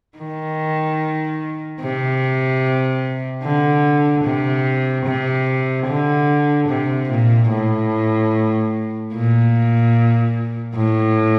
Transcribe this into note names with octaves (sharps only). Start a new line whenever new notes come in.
D#3
C3
D3
C3
C3
D3
C3
A#2
A2
A#2
A2